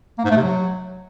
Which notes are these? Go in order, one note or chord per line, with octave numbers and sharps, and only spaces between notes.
A#3
G#2
A3
C3
F#3